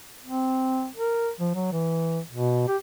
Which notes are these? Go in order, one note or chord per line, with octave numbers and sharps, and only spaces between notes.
C4
A#4
F3
F#3
E3
B2
G4